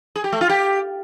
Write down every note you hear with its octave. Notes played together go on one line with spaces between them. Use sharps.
G#4
G4
A3
F4
G4